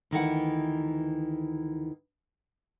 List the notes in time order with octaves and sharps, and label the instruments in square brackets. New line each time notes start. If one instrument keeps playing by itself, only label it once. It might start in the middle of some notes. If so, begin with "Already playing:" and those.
[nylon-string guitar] D2 D#3 E3 F#5